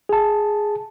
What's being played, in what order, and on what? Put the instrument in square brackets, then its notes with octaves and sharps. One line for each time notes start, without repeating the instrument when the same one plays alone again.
[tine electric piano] G#4 A5